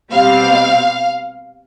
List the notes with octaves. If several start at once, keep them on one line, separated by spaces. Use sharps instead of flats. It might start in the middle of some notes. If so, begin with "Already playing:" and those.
B2 G3 C4 F5